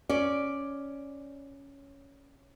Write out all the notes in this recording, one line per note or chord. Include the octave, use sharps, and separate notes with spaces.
C#4 D5